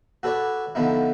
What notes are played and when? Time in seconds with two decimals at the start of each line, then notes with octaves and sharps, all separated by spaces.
0.23 F#4 A4 B4 C#5 D5
0.75 D3 F3 B3 D#4 E4